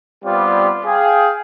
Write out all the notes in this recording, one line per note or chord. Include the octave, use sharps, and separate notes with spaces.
G3 B3 C4 F4 G4 D5
G#4 F5 G5